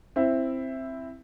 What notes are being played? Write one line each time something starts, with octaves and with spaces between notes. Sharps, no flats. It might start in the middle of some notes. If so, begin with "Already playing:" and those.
C4 E4